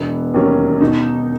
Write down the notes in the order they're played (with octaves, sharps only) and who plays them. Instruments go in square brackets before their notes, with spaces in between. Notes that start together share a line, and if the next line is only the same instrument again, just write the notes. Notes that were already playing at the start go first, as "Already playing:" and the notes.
Already playing: [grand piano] E1 [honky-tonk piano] B3
[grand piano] D#2 D#3 F#3 C#4
[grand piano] B2 [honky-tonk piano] D#4